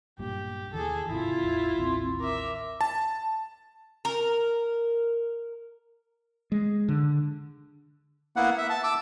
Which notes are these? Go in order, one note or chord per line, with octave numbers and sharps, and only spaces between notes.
B1 G2 A#2 G4
D#2 E3 G#4 A4
G#1 C3 E4 F4
E1 A1
A1 D#2 C4 C6
A#4 E5 D6
A5
A#4
G#3
D3
A#3 B3 E4 F#5
E5
A5
D6 E6